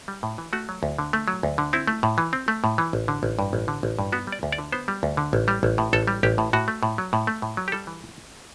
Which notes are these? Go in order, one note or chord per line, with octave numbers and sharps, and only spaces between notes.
G3
A2
E3
A3 F#4
F#3
D2
D3
A3
F#3
D2
D3
C4 E4
A3
A2
E3
C4
A3
A2
E3
A1
D3
A1
G2
A1
D3
A1
G2
B3 F#4
G3
D5
D2
D5
D3
B3 C5
G3
D2
D3
A1
G3
A1
A2
A1 A4
G3
A1 G4
A2
A2 F#4
A3
A2
F#3
A2
A3
A2
F#3
G4
G3 A4
E3